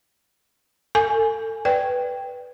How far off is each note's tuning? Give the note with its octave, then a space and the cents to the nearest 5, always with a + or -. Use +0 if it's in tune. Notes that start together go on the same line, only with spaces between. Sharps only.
A4 +30 G#5 +0
B4 +0 D5 +0 G5 +0